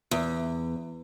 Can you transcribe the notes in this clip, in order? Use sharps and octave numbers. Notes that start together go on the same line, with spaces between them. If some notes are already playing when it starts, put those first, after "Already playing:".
E2